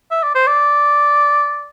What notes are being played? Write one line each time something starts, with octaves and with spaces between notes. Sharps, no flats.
E5
D5
C5
D5